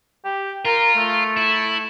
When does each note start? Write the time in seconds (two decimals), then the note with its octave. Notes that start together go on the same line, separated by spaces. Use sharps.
0.24 G4
0.65 F4 A#4
0.96 A3
1.37 E4